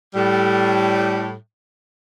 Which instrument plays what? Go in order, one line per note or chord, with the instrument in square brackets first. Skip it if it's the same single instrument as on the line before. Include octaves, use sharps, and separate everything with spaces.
[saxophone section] A2 G3